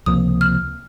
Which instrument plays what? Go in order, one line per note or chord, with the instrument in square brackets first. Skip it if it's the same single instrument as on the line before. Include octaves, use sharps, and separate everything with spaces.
[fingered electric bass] C#2 C3 F3 A#3 [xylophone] D#6
[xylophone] F6